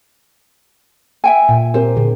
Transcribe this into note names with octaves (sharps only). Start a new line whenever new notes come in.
E5 G5 G#5
A#2
C4 G4 A#4 C5
A#2 D3 G#4